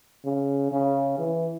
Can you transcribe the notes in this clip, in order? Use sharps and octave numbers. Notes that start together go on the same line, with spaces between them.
C#3
C#3
E3